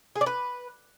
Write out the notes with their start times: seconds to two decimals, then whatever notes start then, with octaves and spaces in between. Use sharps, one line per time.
0.16 G#4
0.21 D5
0.26 B4